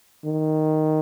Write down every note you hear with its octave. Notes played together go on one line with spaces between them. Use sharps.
D#3